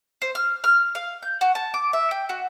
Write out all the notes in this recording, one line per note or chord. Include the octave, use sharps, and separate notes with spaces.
C5
F6
F6
F5
G6
F#4
A5
D6
E5
G5
F#4